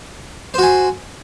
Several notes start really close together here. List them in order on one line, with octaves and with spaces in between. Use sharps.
C5 F#4 G#5